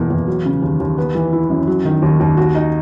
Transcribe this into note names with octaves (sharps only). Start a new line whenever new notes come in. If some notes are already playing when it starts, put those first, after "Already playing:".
Already playing: E2 B2 A#3
E2
F#3
C#3
D#2
D#2
B3
E3
E4
F#2
F#3
D#3
D#2
D#2
F#4
D#4